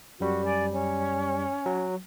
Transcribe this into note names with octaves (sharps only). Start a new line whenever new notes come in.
F#2 G3 F#4
D5 G#5
C#4
F#3